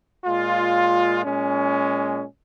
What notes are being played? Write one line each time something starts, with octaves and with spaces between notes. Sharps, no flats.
A#2 G#3 F4
A#2 G#3 C#4